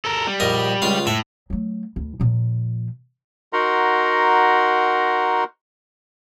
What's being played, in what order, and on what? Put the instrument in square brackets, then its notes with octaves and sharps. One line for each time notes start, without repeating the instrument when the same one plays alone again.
[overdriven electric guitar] A4 A#4
G3
[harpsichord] A#1 A#4 D#5
C#2 F4 F5
[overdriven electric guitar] A2 [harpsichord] E5
[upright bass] F#3 A3
D2
A#2 F3
[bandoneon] D#4 F#4 A#4 F#5 A#5 C6